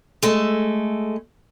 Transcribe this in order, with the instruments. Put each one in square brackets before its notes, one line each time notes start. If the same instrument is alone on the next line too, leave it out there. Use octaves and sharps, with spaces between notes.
[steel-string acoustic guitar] G#3 A3